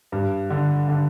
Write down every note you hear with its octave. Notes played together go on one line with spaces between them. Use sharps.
G2
D3
D3